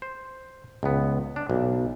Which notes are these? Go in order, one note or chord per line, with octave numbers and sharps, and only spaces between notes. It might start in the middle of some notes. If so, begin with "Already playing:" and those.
C5
C#2 B3
D4
B1